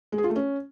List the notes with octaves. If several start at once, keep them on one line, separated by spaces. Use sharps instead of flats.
G#3
G#4
F4
A3
C#4